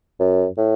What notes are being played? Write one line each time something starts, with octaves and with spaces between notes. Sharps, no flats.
F#2
A2